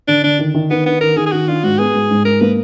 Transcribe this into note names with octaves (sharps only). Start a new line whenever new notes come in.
D3 D4
D3 D4
D#3
D#3
D#3 B3
B3 D4
D#3 A#4
D#3 G#4
G#4
D#3 F#4
D4 F4
G#2 F#4
B3 G#4
G#2
G#2
G#2 A#4
A#3 B4